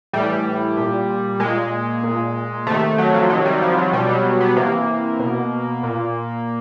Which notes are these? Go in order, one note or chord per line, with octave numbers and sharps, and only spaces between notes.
A2 E3 G3
A#2
A#2 G#3
A#2
C3 D#3 A3
F#3
F3
C3 D#3 F#3
G3
F3
F#3
B2 G3
F#3
B3
C3 E3 A#3
B2
A#2